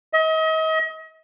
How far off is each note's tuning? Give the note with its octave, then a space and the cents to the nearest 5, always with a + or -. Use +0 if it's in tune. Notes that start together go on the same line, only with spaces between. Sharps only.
D#5 +40